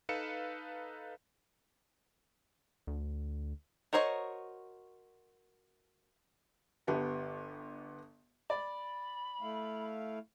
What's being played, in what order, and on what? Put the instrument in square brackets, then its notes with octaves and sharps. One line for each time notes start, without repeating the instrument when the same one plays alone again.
[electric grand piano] D#4 A4 B4 F5 C#7 E7
[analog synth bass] D2
[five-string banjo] F#4 A#4 C5 C#5 D#5
[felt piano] G1 B3 G4 A5
[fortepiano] D5 [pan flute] B5
[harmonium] A3 E4 F5